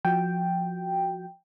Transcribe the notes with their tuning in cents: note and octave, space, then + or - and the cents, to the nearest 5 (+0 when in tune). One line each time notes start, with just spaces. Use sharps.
F3 +10 F#4 +0 G5 +0